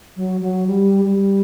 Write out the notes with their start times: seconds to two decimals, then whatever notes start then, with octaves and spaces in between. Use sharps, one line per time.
0.16 F#3
0.41 F#3
0.67 G3
1.05 G3